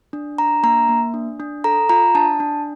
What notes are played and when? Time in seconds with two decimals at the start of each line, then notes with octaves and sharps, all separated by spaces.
0.13 D4
0.38 D4 A#5
0.63 A#3 A#5
0.89 A#3
1.14 D4
1.40 D4
1.64 A4 A#5
1.89 F4 A#5
2.15 D4 A5
2.40 D4